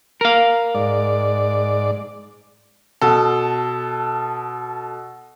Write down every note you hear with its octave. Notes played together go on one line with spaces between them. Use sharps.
A#4 F5
G#2 D5
B2 A4